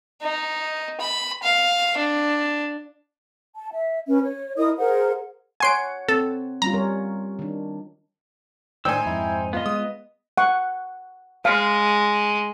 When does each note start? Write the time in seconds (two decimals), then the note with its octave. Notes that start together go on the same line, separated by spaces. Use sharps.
0.22 D#4
1.01 B5
1.43 F5
1.97 D4
3.55 A5
3.72 E5
4.08 C#4 B4
4.22 C#5
4.57 E4 A#4 D#5 D#6
4.79 G#4 A#4 C5 F#5
5.60 C#5 F#5 G#5 C6 D7
6.08 C4 A4
6.62 G3 C#4 F4 A#5
6.74 G3 A#4 C#5
7.39 D#3 D4
8.85 A2 D#3 D4 D#4 C5 G5 G#5 E6
9.06 F2 G#2 E4
9.53 B3 F4 D#5
9.66 G#3 D#6
10.38 F#5 C#6
11.45 G#3 F5